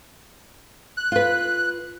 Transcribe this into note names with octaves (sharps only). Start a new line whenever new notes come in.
F#6
F4 B4